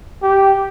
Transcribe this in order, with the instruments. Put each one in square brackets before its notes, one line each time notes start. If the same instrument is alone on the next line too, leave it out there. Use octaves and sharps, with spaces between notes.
[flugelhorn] G4